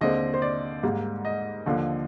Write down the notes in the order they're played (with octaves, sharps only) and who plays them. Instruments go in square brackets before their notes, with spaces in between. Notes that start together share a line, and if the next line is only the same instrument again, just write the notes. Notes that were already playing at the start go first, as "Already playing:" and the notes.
[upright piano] D#2 D3 G#3 C4 D#5
C5
D5
G#2 G3 A#3
D#5
D#2 D3 F3